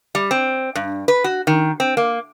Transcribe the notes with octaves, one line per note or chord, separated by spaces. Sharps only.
G3
C4
G2
B4
F#4
D#3
C4
A#3